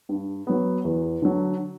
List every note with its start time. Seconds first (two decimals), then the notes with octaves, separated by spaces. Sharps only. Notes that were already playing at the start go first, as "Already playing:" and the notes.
0.09 G2
0.47 F#3 B3
0.85 E2
1.22 D3 F#3